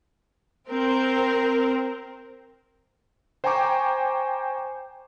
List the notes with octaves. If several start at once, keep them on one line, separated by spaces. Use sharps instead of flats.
C4 A#4
C5 G5 G#5 A#5 C#6 D6